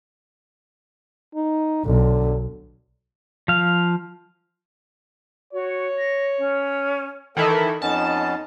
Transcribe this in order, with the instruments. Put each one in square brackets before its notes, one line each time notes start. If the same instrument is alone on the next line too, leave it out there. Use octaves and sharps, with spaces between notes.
[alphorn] D#4
[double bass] B1 [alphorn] D3
[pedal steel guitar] F3 F5
[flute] F#4 [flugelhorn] C#5
[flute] A#6
C#4
[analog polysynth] D#3 E3 E4 [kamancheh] A4
[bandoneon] F2 B3 C#4 [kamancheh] D#4 [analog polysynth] A5